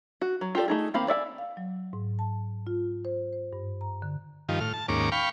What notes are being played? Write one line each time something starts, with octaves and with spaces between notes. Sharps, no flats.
F#4
F#3
F4 G4 A4 D5
A3 D#4 G#4
D#3 A#3 C4 F5 B5
D5 E5 F#5 G#5
F5
F#3
G#2
A5
F4
C5
C5
G2
A#5
D3
G2 D#3 F3
A2 F6
A5
D#2 G#2 A#3 C#4 D6
F5 G5 B5 C#6